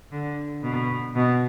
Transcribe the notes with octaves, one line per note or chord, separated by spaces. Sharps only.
D3
B2
B2